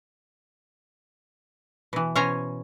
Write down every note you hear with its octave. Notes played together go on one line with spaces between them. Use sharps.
B2 E3
B2 C#4 C5 C#5 G#5 A#5